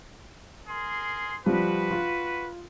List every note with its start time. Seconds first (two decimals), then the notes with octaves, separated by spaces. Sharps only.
0.68 G#4 A#4 C6
1.46 F3 G3 F#4 B4
1.91 F4